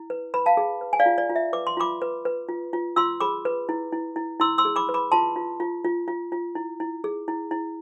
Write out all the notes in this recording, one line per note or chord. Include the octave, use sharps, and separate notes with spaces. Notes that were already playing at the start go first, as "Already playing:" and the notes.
Already playing: E4
B4
B4 B5
F5 A5
G#4
B4
G#5
D5 F5
F4
D5
F4
E5
B4 D6
C6
F4 B5 D6
B4
B4
F4
F4
F4 C6 E6
G#4 B5 D6
B4
E4
E4
E4
E4 C6 E6
C6 E6
G#4
B5 D6
B4
B5 D6
F4 A5 C6
F4
F4
F4
F4
F4
E4
E4
G#4
E4
E4